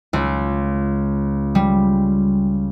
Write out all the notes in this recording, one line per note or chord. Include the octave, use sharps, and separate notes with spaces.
C#2
G3